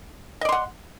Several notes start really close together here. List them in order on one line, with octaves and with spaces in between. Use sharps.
D#5 D5 C6 F#5